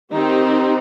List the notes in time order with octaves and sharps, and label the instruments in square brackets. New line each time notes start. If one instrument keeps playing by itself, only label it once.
[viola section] D#3 C4 D#4 G4